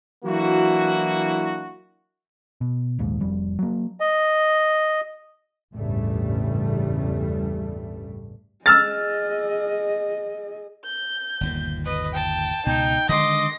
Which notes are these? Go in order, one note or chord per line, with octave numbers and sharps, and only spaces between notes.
E3 F#3 A#3 D4 E4 F#4
B2
A#1 D#2 G#2
F1 F2 G3
F#3 A#3
D#5
A1 E2 G2 C#3 G3 A3
G#4 D#5 E6 F6 A6
G6
G1 D#2 A#2
B4 D#5
G5 A5
C#2 B2 D#4 G5
D3 D#3 G#3 D#5 C6 D6 A#6